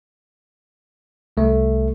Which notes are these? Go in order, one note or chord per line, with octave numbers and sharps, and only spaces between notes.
C2 A3